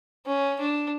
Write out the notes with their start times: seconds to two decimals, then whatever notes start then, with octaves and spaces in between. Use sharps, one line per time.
0.26 C#4
0.60 D4